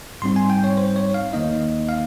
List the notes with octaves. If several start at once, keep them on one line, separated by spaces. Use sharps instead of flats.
G#2 G3 C4 D#4 C6
G#5
G5
C#5
C5
C#5
F5
D#2 D#3 A#3 D#4 D#5
F5